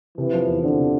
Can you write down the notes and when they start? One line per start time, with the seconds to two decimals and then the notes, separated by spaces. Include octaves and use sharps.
0.18 C3 E3
0.33 F3
0.48 E2
0.63 D3 C4
0.78 C3